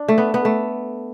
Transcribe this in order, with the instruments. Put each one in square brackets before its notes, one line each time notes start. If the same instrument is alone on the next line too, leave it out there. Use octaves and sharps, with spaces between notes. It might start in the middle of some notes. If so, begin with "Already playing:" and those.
Already playing: [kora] D4
A3
B3
B3
A3